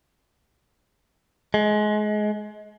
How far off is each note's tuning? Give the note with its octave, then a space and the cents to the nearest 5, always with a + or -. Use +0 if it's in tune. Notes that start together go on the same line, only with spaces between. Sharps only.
G#3 +25